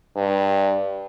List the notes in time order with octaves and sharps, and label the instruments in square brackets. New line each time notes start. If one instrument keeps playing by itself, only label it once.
[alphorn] G2